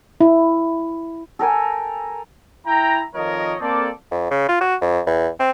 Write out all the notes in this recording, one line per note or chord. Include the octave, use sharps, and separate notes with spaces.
E4
A4 A#4 G5 G#5
E4 G5 A#5
F2 D#3 F3 A#4 C#5 D#5
A#3 C4 A4 D5
F2
C#3
F4
F#4
F2
E2
C4